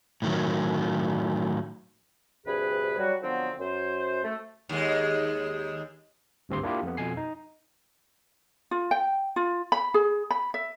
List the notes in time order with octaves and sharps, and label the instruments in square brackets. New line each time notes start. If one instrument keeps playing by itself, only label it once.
[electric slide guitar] A2 D#3 F#3
[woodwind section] D2 G2 C3 G#4 B4 B5
F#3 G3 F#4
D3 F3 F#3 B3 C4
F#2 C5
A3
[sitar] D#2 G#3
[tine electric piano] G#1 D2 G2 C4 G4 C6
A#3 D4 E4 F4 G4
F2 B3
F2 B2 G#5 C7
D#4
[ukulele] F4
G5
F4
B5
G#4
B5
E5